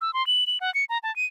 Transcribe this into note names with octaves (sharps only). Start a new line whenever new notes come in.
E6
C6
F#7
F#7
F#5
C#7
A#5
A5
D#7